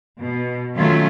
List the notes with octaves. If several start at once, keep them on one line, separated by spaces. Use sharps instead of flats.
B2
D#3 F#3 A3 C#4 F4